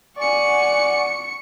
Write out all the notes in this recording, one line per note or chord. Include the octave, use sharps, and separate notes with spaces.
D5 F#5 G#5 C#6 C#7